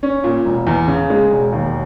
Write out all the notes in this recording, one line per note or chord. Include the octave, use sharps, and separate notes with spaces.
C#4
A#2
E1
E2
C#3
G#3
E1
D#2